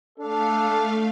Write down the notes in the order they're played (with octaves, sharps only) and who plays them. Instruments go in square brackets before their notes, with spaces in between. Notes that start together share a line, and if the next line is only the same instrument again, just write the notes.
[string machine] A3 F5 [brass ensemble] D4 A4